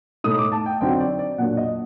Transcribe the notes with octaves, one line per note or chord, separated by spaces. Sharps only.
A2 A3 D#4 D#6
D6
A5
G5
D3 F#3 C4 D#4 G5
D5
D5
A#2 F#3 A#3 D4 F#5
D#5